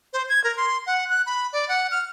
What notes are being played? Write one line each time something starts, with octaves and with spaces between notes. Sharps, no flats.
C5
G#6
A#4
C6
F#5
F#6
B5
D5
F#5
F6